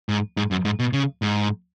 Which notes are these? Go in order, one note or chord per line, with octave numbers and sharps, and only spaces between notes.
G#2
G#2
F#2
G#2
B2
C#3
G#2